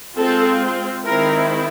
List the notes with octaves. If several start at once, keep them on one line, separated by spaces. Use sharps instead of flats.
G#3 C4 F4 A4
D#3 G#3 C4 E4 A#4